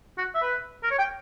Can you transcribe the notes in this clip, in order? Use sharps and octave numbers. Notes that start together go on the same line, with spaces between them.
F#4
E5
B4
A#4
C#5
G5